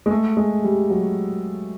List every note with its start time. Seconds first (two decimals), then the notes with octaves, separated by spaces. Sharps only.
0.06 G#3
0.11 A3
0.37 G#3
0.63 G3
0.90 F#3